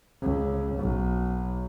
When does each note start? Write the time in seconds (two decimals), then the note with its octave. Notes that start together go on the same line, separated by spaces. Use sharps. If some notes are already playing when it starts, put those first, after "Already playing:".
0.22 C#2
0.79 B1